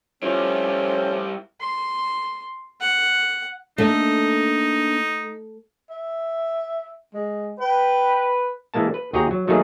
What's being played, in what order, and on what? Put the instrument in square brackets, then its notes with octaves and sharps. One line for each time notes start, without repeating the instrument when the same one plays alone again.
[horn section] F3 A3 C4 [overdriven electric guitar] G3 E4 [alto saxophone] C#4 [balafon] F4
[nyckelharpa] C6
F#5
[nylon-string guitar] A3 [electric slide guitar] A#3 D4 A4 [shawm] D#4
[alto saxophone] E5
G#3
[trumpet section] B4 [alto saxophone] G5
[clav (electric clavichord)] E3 G#3 A#3 A5
B4
D#2 F#4 G#4 G5 A#5
F#3
D#3 F#3 A3 A#3 D#4 G#4